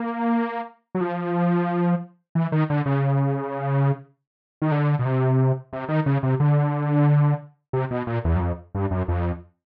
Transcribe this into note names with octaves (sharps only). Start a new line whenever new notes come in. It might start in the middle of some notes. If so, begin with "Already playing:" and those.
Already playing: A#3
F#3
F3
E3
D#3
D3
C#3
D#3
D3
B2
C3
C3
D#3
C#3
C3
D3
C3
B2
A#2
E2
F#2
F2
G2
F#2
F2